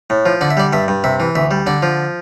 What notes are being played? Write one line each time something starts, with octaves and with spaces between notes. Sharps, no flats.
A2
F3
D3 D5
E5
G3 D5
G2 E5
G2
C3 E5
E3
D2 E5
G3
D3 D5
F3